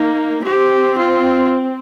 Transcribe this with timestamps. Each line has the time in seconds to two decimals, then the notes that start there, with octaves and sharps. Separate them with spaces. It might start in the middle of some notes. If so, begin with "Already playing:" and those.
Already playing: A#3 D#4
0.44 C4 G4
0.99 F4